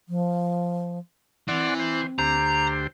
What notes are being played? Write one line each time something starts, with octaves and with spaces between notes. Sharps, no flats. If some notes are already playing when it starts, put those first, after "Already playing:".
F3
E3 C4 D5 F#5 C6
C5
D2 G4 C5 A#5